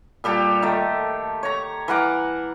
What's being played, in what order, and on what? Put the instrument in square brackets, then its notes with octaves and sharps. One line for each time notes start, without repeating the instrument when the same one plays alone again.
[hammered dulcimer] A#2 G3 G4 A4
D#3 A3
C#5 A#5
E3 A#4 F#5 D6